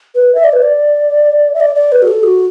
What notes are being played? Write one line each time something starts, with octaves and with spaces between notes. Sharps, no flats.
B4
E5
D5
B4
D5
E5
D5
D5
B4
F#4
A4
F#4